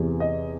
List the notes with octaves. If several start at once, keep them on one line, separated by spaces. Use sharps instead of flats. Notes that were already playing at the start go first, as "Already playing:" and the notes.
Already playing: E2 C3 E3
D#5